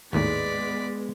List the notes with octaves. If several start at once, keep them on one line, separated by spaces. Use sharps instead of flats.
G#1 D#2 A2 G#3 B3 D5 B6